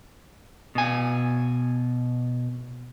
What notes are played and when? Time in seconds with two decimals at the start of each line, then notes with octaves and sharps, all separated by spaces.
0.75 B2 G#5